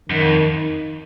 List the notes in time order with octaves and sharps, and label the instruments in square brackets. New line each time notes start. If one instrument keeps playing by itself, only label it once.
[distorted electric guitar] F#2 [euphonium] D#3
[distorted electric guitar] F2